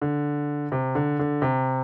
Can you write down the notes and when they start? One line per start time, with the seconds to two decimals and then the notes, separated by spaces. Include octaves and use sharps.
0.02 D3
0.72 C3
0.95 D3
1.19 D3
1.42 C3